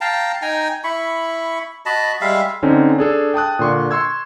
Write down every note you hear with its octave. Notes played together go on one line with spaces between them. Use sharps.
F5 G5 A5 A#5
D#4 G5 G#5 A#5
E4 B5 C#6
F#4 D#5 A5 B5
G3 G#3 E5 F5
D3 C4 C#4 D#4
D4 G#4 A4
G5 A5 D#6 F#6
A#2 D3 C6 C#6
C6 C#6 E6 G#6